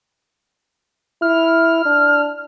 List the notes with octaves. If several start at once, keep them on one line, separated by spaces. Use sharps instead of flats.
E4 F6
D4